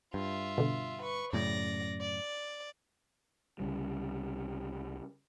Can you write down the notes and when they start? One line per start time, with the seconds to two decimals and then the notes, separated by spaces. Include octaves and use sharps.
0.14 G2 F4 E5
0.58 B2 D3
1.02 B4 C#6
1.33 F#2 A2 C#3 D5 A#6
2.01 D5
3.60 C2 C#3 G3